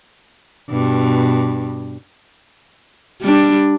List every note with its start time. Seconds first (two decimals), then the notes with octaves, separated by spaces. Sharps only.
0.69 G2 B2
3.21 G3 D4